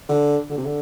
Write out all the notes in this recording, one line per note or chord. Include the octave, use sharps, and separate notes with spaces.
D3
D3
C3
D3